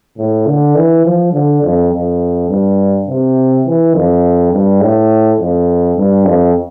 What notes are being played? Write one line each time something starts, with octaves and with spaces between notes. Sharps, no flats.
A2
D3
E3
F3
D3
F2
F2
G2
C3
E3
F2
G2
A2
F2
G2
F2